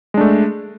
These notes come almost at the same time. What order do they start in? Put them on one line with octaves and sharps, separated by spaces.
G#3 D4 A3